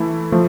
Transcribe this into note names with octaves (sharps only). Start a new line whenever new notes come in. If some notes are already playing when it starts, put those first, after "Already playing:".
Already playing: E3 A3 E4 A4
F3 A3